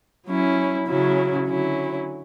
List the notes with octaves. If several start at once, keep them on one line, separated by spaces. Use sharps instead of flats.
F#3 C#4 E4
C#3 F#3 C#4 E4
D3 F#3 C#4 E4